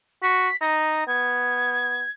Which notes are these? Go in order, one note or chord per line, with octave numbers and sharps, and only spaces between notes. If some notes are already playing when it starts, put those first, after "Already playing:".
F#4 B6
D#4 A#6
B3 G#6